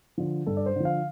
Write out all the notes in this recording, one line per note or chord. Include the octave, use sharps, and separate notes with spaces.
D3 F3
G2 A4
D5
C5
D3 F3
F5